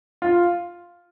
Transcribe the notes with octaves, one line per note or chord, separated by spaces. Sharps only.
F4